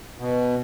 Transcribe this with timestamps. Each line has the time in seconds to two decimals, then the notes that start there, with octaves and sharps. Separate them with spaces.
0.18 B2